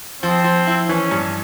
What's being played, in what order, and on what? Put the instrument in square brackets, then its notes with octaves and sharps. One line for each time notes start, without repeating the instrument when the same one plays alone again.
[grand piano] F3 [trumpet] C4
[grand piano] F3
E4
[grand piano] E3 [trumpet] C#4
[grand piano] G2